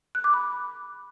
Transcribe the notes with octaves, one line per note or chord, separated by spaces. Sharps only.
F#6
D6
B5